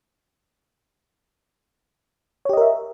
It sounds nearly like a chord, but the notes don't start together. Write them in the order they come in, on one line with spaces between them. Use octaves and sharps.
C#5 G4 D#5 A#4 E5